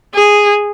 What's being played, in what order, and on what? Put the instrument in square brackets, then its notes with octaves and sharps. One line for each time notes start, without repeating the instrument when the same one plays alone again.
[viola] G#4